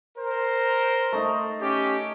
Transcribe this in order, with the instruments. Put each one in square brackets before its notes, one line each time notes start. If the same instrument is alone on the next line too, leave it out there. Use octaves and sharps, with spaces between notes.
[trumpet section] A#4 C5
[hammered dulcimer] A3 D#4
[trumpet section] C#4 G4